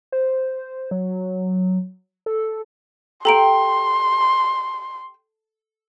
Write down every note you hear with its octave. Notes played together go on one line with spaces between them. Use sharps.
C5
F#3
A4
G4 A4 G5 A#5 C6 D7